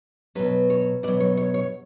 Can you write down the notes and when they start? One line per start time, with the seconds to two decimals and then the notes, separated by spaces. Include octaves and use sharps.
0.35 B2 F#3 B4
0.70 C#5
1.03 B2 D5
1.08 F#3
1.20 C#5
1.37 C#5
1.54 C#5